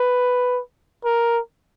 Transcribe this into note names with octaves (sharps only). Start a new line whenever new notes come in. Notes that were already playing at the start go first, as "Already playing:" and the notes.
Already playing: B4
A#4